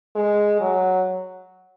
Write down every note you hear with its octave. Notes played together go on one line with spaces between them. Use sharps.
G#3
F#3